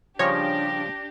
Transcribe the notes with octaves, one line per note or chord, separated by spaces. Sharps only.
C#3 F3 G3 D4 G4 C#5 A#6